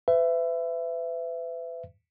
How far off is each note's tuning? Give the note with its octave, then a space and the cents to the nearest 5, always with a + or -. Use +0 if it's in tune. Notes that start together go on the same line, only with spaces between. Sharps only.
B4 +35 E5 +20